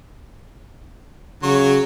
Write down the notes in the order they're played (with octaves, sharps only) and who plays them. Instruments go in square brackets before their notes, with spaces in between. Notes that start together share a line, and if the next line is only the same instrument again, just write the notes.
[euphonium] C#3 [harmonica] F#3 C#6